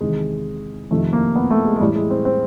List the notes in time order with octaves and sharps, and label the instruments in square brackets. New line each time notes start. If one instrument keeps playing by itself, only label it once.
[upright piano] E2 C3 D#3 G#3
F2 C3 D#3 A3
A#3
B3
A3
G#3
G#3
A2 E3 G3
G#3
C4
C4